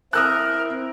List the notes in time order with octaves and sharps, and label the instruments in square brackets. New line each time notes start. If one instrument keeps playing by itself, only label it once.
[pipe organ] C4 E4 [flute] A#4 [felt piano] D#6 E6 F#6